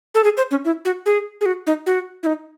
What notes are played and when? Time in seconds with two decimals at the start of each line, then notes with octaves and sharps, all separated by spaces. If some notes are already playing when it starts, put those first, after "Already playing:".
0.15 A4
0.24 G#4
0.37 C5
0.51 C#4
0.65 E4
0.85 F#4
1.06 G#4
1.41 G#4
1.46 F#4
1.67 D#4
1.86 F#4
2.23 E4
2.26 D#4